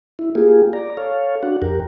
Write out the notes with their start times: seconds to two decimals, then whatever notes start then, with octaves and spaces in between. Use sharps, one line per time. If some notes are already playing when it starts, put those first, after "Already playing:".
0.19 E4
0.35 A#3 F4 G4 G#4
0.73 D5 A#5
0.97 A4 C#5 F5
1.43 D4 F#4 F#5
1.62 F2 G4 A#4